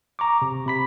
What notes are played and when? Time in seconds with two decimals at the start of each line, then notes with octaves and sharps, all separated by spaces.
0.19 A#5 C#6 D6
0.42 C3
0.67 C3 B5 B6